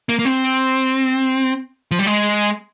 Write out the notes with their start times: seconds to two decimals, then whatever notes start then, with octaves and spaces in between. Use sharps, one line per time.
0.09 A#3
0.19 A#3
0.25 C4
1.91 F3
1.99 G3
2.06 G#3